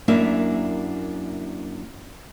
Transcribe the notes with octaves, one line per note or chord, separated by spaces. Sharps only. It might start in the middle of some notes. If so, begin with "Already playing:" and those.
F#2 A#3 D4 E4 E5